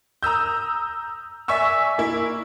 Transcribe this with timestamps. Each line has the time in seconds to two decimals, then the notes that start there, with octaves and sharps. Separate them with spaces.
0.23 A#5 D#6 E6 G6
1.48 D5 E5 G#5 C#6 E6
1.98 A#3 E4